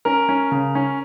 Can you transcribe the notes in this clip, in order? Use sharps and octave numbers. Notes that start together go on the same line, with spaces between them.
C#4 A#4
C#4
C#3
C#4